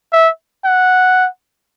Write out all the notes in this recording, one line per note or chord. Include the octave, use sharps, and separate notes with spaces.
E5
F#5